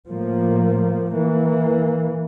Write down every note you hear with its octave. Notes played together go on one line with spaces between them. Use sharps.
A2 F3 A#3
E3 A#3